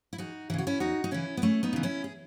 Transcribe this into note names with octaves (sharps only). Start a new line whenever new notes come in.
E4
E2 D#4 F#4
C#3 E3 E4 F#4
C#4 E4
E2 D#4 F#4
D#4
C#3 E3 C#4 E4
B3
E2 A3 C#4
B3 D#4
C#3 E3
C#4 E4
G#4